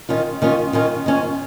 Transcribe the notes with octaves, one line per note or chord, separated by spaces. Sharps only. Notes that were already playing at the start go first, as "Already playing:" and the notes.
D#3 C#4 F4
D#3 C#4 F4
D#3 C#4 F4
D#3 C#4 F4